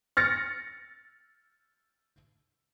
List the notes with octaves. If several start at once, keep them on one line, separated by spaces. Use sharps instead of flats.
F6 A6 A#6 C#7